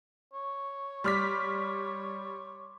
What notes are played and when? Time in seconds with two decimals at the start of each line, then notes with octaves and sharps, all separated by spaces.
0.33 C#5
1.04 G3 C6 D6 F6 B6